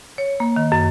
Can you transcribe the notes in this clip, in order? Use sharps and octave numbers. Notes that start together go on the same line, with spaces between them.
C#5
A#3
D#3
F#2